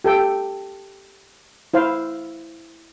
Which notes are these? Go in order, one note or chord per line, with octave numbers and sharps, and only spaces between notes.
G4 A4 G5
E4 C5 F5